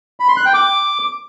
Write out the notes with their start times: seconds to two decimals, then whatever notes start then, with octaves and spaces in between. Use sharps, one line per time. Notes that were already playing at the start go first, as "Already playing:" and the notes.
0.20 B5
0.28 C6
0.37 F#6
0.45 G5
0.54 D6